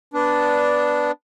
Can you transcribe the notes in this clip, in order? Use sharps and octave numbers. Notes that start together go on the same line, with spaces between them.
B3 D4